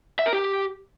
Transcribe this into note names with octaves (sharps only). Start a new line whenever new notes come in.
E5
A#4
G4